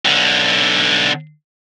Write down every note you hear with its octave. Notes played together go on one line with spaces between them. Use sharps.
B1 D3